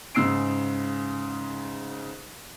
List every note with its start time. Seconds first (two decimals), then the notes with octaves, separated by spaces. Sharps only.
0.15 G#2 C#3 E6 C7 D7